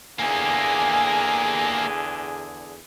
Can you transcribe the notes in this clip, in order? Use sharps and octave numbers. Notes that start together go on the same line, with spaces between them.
E2 D3 A#3 G4 G#4 G#5